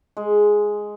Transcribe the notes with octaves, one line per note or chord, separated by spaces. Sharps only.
G#3